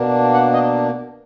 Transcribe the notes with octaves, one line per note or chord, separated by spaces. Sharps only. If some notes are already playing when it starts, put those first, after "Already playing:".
Already playing: B2 A#3 D4
F#5
D#5